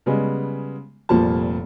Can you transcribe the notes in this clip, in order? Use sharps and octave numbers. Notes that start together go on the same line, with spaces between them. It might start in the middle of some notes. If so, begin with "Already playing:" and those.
C#3 G3 G#3 B3
F1 A#2 F3 G3 A5